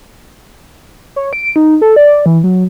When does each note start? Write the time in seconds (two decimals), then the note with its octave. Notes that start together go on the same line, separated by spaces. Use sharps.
1.16 C#5
1.33 D7
1.56 D#4
1.82 A4
1.96 D5
2.26 E3
2.44 F#3